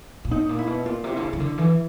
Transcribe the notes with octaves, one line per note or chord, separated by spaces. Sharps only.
A#2
A2 D#4
A#2
E4
B2
A#2 F4
C3
D3 E4
C#3
C#3
D3
E3